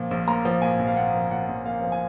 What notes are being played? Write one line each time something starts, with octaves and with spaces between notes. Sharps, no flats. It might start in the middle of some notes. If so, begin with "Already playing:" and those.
Already playing: A#2 F3 A#3
A#1
A#3 A#5
F3
A#2 G#5
A#1
F5
A#3 F#5
F3
A#2 F#5
A#1
A#3 F5
F3
G#5